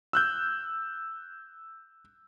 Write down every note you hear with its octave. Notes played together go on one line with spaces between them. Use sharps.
E6 F#6 G6